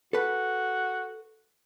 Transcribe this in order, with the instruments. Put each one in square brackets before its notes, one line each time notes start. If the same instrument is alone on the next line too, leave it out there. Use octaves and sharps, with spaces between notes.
[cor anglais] F#4 [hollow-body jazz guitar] A4 B4